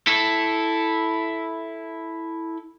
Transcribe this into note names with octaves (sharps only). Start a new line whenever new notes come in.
E4 A4